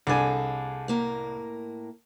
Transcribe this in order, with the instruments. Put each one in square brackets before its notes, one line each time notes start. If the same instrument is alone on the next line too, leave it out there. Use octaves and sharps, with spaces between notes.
[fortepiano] C2 D4 G#5 [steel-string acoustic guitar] G#4 A4
[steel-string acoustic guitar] A2 A#3 A#4